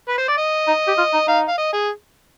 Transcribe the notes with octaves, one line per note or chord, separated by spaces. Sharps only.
B4
C5
D5
D#5
D#4
G4
F4
D#4
D#4 F5
F5
D#5
G#4